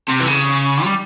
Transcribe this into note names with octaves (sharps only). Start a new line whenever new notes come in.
C3
E3
C#3
G3